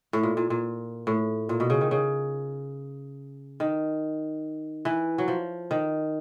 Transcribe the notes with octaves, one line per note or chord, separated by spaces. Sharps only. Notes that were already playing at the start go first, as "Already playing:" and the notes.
A2
A#2
A#2
A#2
A2
A#2
B2
C#3
D#3
C#3
D#3
E3
F#3
F3
D#3